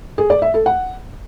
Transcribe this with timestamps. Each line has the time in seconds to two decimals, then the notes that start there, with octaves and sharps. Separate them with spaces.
0.18 G#4
0.30 D5
0.42 E5
0.54 A4
0.66 F#5